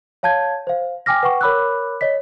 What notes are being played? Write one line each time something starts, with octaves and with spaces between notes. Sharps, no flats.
C#5 F5 A5 G6 G#6
C5 F5
G5 G#5 D6 F6 A#6
B4 F#5 G5 C#6
A#4 C#5 B5 D6 E6 F#6
C#5 D#5 B6